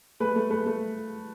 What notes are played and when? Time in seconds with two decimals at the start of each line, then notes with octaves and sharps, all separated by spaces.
0.20 A3 B4
0.36 A3
0.50 A3 B4
0.66 A3